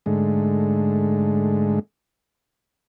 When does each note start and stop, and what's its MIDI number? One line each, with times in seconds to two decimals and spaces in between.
0.06 1.79 44
0.06 1.79 50
0.06 1.79 56
0.06 1.79 57